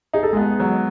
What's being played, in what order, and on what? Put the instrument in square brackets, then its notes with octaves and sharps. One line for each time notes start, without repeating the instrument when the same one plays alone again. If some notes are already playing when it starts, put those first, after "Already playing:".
[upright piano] D#4 [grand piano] G#4
[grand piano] A4
[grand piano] G#3 G#4 [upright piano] B3
[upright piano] F#3